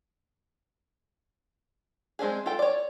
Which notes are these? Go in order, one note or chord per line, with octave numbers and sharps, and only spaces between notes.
G#3 C4 D4 G#4
F4 A4 G5
C#5 D5